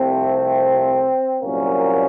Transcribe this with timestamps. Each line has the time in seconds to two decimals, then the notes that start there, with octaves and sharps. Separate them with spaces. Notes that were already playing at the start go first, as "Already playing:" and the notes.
Already playing: C2 C3 F3 A3 C4
1.41 C2 A#2 F#3 A#3 C#4